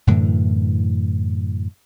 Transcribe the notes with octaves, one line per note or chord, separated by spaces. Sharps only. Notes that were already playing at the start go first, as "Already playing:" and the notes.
F#2 A2 D3 E3